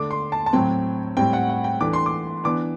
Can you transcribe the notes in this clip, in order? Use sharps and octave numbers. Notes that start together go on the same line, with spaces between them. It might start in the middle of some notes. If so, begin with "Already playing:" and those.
Already playing: D3 A3 D4 D6
C6
A5
A5
A2 F#3 C4 G5
A2 G3 C4 G5
F#5
F#5
G5
E3 A3 D4 D6
C6
D6
E3 B3 D4 D6